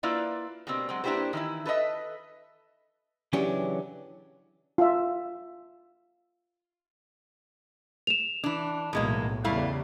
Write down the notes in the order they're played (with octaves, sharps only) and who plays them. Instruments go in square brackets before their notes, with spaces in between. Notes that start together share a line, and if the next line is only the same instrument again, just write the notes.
[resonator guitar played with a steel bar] A#3 E4 F4 B4 D5 E5
B2 G3 A#3 C4
F#3 G#3 C4
A#3 D4 E4 G4 B4 C5
D#3 E3 E4
A4 B4 C#5 D#5 E5
[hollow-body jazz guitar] C#3 E3 F#3 C#4 D4 G4
[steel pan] F4 E5
[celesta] E7 F7
[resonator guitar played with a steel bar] E3 D4
[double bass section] B1 A2 [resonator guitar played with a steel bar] E2 G#3 A#3
[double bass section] E2 C#3 G3 [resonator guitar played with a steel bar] A3 E4 F5